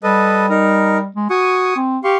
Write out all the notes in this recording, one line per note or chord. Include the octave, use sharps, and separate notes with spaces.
G3 A4 B4 D#5
D#4 A#4
G#3
F#4 G#5 C#6 D#6
C4
G4 F5 C6 C#6